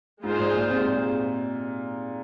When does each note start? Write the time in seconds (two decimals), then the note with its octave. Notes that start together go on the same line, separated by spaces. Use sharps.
0.23 G#2 G#3 F4 G#4 C5
0.39 A#2
0.55 A#2
0.70 C3
0.86 A#2